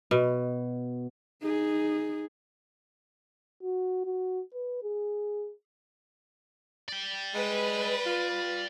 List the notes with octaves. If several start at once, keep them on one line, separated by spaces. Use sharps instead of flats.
B2
D#4 G#4
F#4
F#4
B4
G#4
D5 G5
G#3 B4
F4